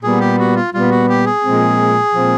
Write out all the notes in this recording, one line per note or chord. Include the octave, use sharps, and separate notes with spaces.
A#2 G3 B3 G#4
G4
F#4
F4
A#2 G3 B3 F4
F#4
G4
G#4
A#2 F3 G#3 C4
A#2 F3 G#3 C4